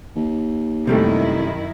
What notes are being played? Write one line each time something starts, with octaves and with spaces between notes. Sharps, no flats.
D#2
F#2 C3 D#3 G3 A3 E4